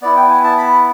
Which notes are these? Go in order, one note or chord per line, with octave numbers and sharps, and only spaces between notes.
B3 E4 D5
G5
G#5
A5
B5